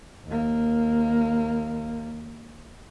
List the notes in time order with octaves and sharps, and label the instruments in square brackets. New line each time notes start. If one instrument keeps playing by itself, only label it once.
[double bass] D#2 A#3